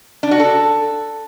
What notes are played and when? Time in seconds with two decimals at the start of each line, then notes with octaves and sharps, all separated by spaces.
0.23 D4
0.31 F#4
0.40 A4